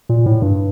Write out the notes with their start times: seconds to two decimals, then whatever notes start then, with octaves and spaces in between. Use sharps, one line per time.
0.09 A#2
0.26 A2
0.42 G2